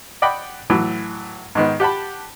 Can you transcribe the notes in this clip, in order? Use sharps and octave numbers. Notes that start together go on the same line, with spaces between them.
D5 D#5 F#5 G5 B5 D6
A2 E3 F#3
G#2 D#3 B3
G4 F#5 A5 B5